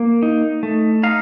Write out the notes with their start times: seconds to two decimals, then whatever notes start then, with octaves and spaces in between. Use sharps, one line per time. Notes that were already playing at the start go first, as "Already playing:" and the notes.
Already playing: A#3
0.23 D#4
0.63 A3
1.03 D#4 F5